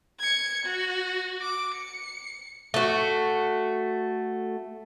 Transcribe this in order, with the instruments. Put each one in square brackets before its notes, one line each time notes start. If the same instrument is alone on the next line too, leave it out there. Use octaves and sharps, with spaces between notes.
[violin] G#6 C#7
F#4
D6
C#7
[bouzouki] A3 F#4